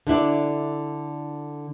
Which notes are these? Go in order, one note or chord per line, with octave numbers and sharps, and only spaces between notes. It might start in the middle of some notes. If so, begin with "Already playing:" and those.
D3 D4 E4 D5